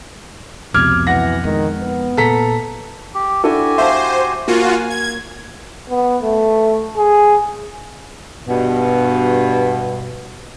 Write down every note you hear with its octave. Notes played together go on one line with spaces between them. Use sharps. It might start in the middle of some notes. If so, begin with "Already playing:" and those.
C2 F2 B2 D6 F6 G#6
E3 F#5 A#6
D#3 F3 G#3
B3
A#2 A4 A#5 B6
G4
D4 E4 F#4 G4 A4 G#5
C5 E5 F5 A5
A#3 F4 F#4 G#5
G#6
B3
A3
G#4
G2 B2